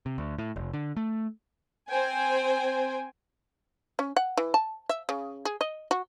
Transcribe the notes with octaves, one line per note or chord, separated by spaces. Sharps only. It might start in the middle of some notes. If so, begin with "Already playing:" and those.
C3
D2
A2
F1
D3
A3
C4 C5 G5 G#5
C#4
F#5
E3
A5
E5
C#3
G#4
D#5
F#4